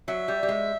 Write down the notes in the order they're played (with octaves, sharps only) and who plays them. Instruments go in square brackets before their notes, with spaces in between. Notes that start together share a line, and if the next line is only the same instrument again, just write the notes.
[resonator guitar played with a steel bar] F#3 [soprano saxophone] E5
[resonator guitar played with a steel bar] G3
G3
G#3